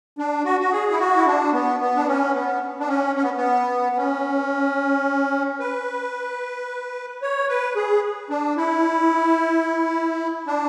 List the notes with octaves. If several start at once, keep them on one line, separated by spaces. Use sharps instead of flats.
D4
F#4
F#4
G#4
E4
F#4
E4
D4
B3
B3
D4
C#4
B3
D4
C#4
C#4
B3
B3
B3
C#4
B4
C#5
B4
G#4
D4
E4
D4